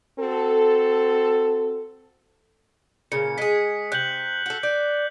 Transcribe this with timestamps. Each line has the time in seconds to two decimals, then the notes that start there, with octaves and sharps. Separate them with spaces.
0.19 C4 F#4 A4
3.12 A#2 C#3 C#7
3.38 G#3 G#4 B6
3.92 C3 F#6 G6 F#7
4.46 F#4 A4
4.63 D5 G6